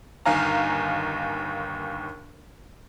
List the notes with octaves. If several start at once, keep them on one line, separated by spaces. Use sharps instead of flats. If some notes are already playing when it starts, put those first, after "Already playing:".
G1 D#2 D#4 F5 G#5 A#5